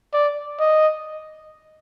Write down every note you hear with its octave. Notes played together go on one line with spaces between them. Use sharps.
D5
D#5